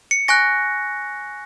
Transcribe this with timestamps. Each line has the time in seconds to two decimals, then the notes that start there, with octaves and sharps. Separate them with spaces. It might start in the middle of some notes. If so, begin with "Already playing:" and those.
0.11 C#7
0.28 G#5 C#6 F#6 A#6